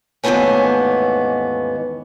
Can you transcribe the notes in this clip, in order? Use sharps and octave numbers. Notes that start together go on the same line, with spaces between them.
D#2 G#2 E3 A3 B3 C#4